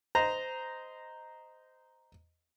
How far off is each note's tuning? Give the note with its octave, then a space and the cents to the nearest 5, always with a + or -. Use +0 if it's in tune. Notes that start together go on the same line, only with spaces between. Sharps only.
C5 -15 D#5 +0 A#5 +0